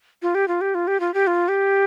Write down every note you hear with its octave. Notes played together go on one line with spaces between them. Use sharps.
F4
G4
F4
G4
F4
G4
F4
G4
F4
G4